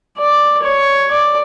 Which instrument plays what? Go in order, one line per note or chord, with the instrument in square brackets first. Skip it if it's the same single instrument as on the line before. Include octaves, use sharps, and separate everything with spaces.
[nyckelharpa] D5
C#5
D5